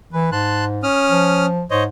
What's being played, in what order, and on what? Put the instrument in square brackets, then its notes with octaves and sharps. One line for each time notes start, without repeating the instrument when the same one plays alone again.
[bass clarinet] E3 [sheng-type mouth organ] B4
[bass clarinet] G#2 [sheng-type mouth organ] A5 C6 F#6
[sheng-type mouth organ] C#4 D#6 F6
[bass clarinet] F3
[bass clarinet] G#2 [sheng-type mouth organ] C5 C#5 D#5